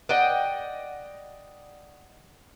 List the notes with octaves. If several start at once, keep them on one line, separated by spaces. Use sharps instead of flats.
D5 D#5 F#5 G5